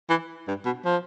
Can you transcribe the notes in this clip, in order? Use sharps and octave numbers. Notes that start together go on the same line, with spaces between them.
E3
G2
B2
F3